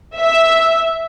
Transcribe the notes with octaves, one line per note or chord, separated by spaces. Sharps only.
E5